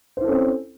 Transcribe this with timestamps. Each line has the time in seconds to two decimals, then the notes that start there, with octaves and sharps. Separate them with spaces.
0.17 C5
0.21 E4
0.25 A4
0.28 C#4
0.32 C4